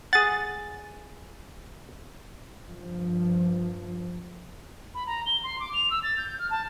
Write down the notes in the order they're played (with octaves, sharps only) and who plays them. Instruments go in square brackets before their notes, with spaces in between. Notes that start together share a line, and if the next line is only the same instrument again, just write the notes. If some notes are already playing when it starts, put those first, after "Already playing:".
[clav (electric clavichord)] G#4 F#5 [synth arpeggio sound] A6
[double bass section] G2 F3
[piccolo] B5
A#5
G7
C6
D6
F7
E6
A6
G6
F6
A5